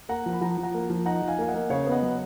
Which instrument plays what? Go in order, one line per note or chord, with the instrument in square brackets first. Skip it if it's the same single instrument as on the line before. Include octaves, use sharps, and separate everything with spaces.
[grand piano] A#3 F#5 A#5
F3
B5
F3 F#5 A#5
F3
F#5 A#5
A#3
F3
D#4 F#5 A#5
F3
F5 G#5
A#3 F5
D#5 F#5
A#3
C#3 C#5 F5
B3
D#5 F#5
F#3